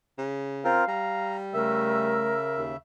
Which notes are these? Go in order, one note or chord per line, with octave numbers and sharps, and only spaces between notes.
C#3
C4 F4 A#4 F5
G3 A#5
C#3 A3 A#4 E5 E6
D#2